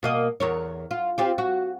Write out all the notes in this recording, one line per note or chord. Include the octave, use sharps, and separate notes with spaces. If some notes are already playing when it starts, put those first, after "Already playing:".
B2 A#3 D#5
E2 A#4 C#5
F4
C4 F4 G4
F#4